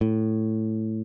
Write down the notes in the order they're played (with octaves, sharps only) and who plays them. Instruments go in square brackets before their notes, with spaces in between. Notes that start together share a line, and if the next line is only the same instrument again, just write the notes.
[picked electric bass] A2